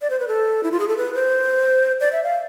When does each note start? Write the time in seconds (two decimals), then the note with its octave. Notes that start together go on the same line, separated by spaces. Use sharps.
0.02 D5
0.10 C5
0.20 B4
0.28 A4
0.63 E4
0.72 F4
0.80 G#4
0.88 A4
0.97 B4
1.15 C5
2.01 D5
2.12 E5
2.24 F5